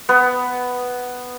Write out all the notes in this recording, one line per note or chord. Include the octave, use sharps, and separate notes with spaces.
B3